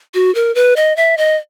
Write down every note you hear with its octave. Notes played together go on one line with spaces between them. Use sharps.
F#4
A#4
B4
D#5
E5
D#5